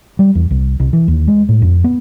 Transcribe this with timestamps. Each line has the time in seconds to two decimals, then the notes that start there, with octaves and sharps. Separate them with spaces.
0.19 G3
0.35 E2
0.51 C2
0.80 C2
0.93 E3
1.08 D#2
1.27 G#3
1.49 A2
1.62 F2
1.84 B3